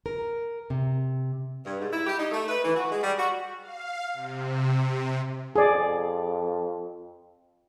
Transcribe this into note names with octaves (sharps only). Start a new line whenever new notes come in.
A#4
C3
G2
G#2
E4
G4
D#4
A3
B4
E3
F#4
G#3
G3
F#4
F5
C3
F2 G#4 D5